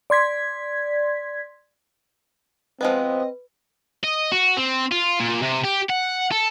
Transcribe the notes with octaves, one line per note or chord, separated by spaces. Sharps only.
D5 C6 G#6 B6
F3 G#3 B3 C4 B4 D#5
D#5
F#4
C4
F4
A#2
C3
G4
F#5
A4